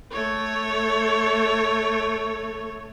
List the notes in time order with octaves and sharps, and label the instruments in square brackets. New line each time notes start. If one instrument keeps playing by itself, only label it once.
[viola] A3 C#5